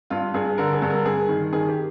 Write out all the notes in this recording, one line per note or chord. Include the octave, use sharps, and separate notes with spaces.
G2 F4
G2 G#4
D3 A#4
G#4
G2
A#4
G2 G#4
D#3
D#3 G#4
G4